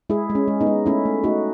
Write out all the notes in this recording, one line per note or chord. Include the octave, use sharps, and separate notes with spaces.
G#3 E4 G#4
G#3
C#4
G#3
B3 D#4
G#3
A3 C#4 E4
A3
A3 D#4 F#4